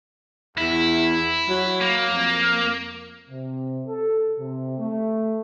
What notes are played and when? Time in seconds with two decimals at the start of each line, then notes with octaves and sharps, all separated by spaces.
0.58 E2 E4
1.49 F#3
1.81 A#3
2.11 F2
3.30 C3
3.87 A4
4.39 C3
4.79 A3